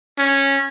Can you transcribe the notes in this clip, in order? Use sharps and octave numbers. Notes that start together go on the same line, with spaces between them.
C#4